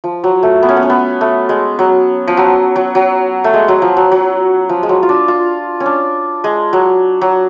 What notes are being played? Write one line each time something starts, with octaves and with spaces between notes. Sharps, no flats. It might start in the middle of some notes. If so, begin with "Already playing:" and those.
F3
F#3
A3
B3
C#4
B3
C#4
B3
A3
G#3
F#3
F3
F#3
F#3
F#3
A3
G#3
F#3
F3
F#3
F#3
F3
G#3
F#3
F4
D4
F4
C#4
D4
G#3
F#3
F#3